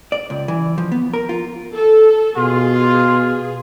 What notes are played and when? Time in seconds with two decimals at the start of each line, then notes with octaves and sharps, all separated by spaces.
0.12 D5
0.30 C#2
0.48 E3
0.78 F3
0.92 B3
1.14 A#4
1.29 F4
1.75 A4
2.37 B2 F4 G#4